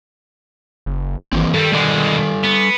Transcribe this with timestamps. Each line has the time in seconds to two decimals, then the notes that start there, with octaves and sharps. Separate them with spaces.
0.86 F#1
1.32 G#1 E3 A#3 C4
1.54 G2 D#3 G3 A4
1.72 B2 G3 G#3 A4 D5
2.44 B3